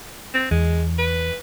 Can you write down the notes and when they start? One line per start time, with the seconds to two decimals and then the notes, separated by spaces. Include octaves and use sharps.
0.34 C4
0.51 E2 G#3
0.98 B4